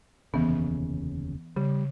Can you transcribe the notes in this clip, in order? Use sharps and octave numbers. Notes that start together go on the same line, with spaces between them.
F1 D#2 C#3 E3 B3
C#3 G3